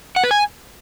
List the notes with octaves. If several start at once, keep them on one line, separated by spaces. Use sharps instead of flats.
F#5
B4
G#5